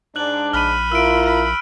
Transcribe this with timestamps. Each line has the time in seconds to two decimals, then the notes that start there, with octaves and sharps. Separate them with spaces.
0.16 G#2 D4 D5 F#6 F#7
0.53 A#1 B5 F6 D#7
0.92 E4 F4 A#4 E6 D7
1.26 B5